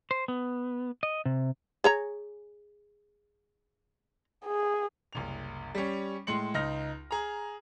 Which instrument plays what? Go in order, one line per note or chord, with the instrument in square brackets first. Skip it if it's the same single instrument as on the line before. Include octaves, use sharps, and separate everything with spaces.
[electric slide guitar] C5
B3
D#5
C3
[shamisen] G#4 C#5 A#5
[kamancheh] G#4
[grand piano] F#1 C2 F7
G3 C#4
A2 G#3 C6 C#7 F#7
C#2 D#4 F6 A#6
G#4 A#5